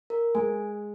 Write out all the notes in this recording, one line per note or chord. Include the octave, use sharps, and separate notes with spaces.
A#4
G#3 G#5